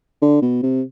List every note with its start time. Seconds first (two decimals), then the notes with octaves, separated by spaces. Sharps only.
0.22 D3
0.42 B2
0.63 C3